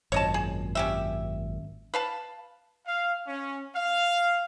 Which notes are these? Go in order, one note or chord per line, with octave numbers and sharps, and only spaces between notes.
G#1 F#2 A#2 C#5 D#5 A5
G#4
C#4 G4 E5
B4 F5 A5
F5
C#4
F5